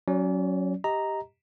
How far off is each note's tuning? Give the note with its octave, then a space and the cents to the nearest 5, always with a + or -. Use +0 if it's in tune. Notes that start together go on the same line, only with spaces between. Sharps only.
F#3 +0 C#4 +0 D5 -30
G4 +5 D#5 +15 A#5 +0